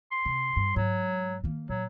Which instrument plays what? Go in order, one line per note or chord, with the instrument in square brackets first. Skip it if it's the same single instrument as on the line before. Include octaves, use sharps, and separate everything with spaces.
[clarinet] C6
[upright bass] C3
G2
[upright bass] G#2 [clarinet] F#3
[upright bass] D#3 A#3
[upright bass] A#2 [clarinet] F#3